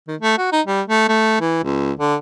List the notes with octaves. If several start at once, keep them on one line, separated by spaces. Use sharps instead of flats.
D#3
A3
F#4
D#4
G3
A3
A3
E3
C#2
D3